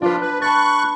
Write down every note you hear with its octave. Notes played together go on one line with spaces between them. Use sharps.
F3 D4 F4 B4
B4 F#6
A5 B5 C#6 F#6 A6